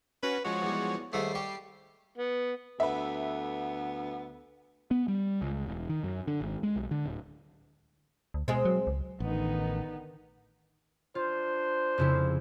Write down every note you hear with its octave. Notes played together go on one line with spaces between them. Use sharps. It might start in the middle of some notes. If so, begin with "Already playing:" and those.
C#4 F#4 B4
F3 G#3 F#4 C#5
E2 G3
D#2 G#2 G3 A3 C7
G4 G5 C#6
B3
D2 B3 B4 E5
B3
G3
C#2
E1
D#3
F#2
D3
G#1
G#3
B1
D3
D1
D2
B2 G#3 C4
F#3
C#2
A1 D3 D#3 B3 D#4
D4 F4 C5
F2 C#3 E4